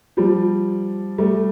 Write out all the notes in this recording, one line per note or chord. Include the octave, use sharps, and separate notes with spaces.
F3 G3
G3 A3